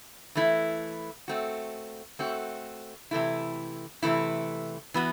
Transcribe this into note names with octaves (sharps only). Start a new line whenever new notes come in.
E3 A3 E4
A3 C4 F#4
A3 C4 F#4
C3 E3 A3 E4
C3 E3 A3 E4
E3 B3 F#4